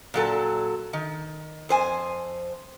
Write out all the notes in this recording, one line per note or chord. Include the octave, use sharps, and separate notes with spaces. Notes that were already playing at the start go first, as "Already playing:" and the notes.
A#2 F#3 A4
D#3
F2 C5 G#5